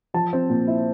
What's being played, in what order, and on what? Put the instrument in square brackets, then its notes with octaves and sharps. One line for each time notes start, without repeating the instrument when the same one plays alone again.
[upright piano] F3 A5
C4
A#2
E4